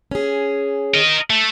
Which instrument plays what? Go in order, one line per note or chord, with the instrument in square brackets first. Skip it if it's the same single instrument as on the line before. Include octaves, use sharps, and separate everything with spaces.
[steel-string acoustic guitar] C#4 G#4
[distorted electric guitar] A#4 D#5
A3